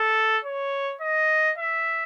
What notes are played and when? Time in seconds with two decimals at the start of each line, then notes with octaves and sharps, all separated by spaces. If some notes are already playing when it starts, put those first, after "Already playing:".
Already playing: A4
0.44 C#5
1.01 D#5
1.58 E5